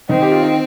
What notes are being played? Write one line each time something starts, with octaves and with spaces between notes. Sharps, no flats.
D#3 C4 D#4
G4
F4
D#4